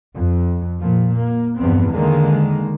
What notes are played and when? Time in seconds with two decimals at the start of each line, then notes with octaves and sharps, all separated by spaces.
0.15 F2
0.80 A#2 F3
1.15 A#3
1.57 E2 G2 F3 B3 C4
1.91 D3 D#3 G#3 A#3